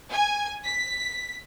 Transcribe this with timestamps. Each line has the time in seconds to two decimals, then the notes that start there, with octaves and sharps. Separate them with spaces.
0.11 G#5
0.63 B6